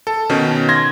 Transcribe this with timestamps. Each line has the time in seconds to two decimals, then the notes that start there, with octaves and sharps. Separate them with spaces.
0.07 A4
0.29 B2 D#3 C#4
0.69 C6 G#6 A#6